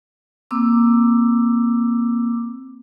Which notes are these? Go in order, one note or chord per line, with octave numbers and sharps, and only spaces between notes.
A#3 C4 D6 E6